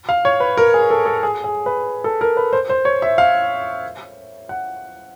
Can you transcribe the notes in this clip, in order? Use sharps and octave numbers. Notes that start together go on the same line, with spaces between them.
F5
C#5
B4
A#4
G#4
A4
A4
G#4
G#4
B4
A4
A#4
B4
C5
C5
C#5
E5
F5
F#5